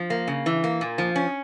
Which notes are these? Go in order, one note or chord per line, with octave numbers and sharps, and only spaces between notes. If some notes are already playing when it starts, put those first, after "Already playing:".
Already playing: F3
A#3
C#3
E3
A#3
A#2
F3
C#4